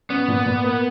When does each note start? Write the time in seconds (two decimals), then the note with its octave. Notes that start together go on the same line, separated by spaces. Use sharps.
0.10 B3 C#4
0.28 A#2
0.46 A#2
0.64 A#3